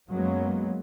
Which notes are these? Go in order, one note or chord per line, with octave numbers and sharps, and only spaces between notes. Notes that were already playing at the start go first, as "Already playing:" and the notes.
F#2 F#3 G#3 A#3 B3 C#4